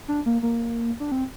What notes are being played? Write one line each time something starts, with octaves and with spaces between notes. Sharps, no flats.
D4
A#3
A#3
D4
C4